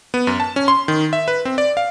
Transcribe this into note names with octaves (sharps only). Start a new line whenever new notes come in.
B3
F#2
A5
C#4
C6
D#3
E5
B4
C4
D5
F5